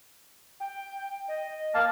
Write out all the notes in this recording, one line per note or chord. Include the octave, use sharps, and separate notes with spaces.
G5
D#5
A#3 F5 A5